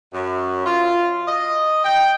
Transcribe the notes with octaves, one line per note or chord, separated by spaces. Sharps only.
F#2
F4
D#5
G5